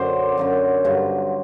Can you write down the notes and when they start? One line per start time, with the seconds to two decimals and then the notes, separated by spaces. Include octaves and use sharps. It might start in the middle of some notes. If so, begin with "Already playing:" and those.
Already playing: F#2 D3 F#3 C5 D5
0.38 F#2 D3 F#3
0.85 G2 D3 F#3